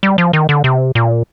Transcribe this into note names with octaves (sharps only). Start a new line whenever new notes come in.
G3
F3
D#3
D3
C3
A#2